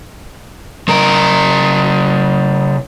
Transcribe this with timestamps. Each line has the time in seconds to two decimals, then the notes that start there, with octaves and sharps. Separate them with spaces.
0.88 C#3 A#4